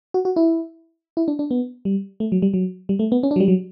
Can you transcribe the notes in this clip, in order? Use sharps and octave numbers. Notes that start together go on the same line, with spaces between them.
F#4
F#4
E4
E4
D4
D4
B3
G3
A3
F#3
G3
F#3
G3
A3
B3
C#4
D4
F#3
G3
F#3